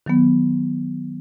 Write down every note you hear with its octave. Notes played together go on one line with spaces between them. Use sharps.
D#3 F#3 B3